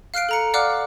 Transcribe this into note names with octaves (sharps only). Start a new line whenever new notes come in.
F5 F6 F#6 C7 D7
A4 A#5 C#7
D5 F5 F#5 D6 F6 F#6